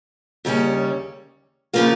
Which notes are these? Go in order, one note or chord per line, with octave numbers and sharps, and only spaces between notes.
D#2 C#3 G3 C#4
C#3 F3 A#3 F4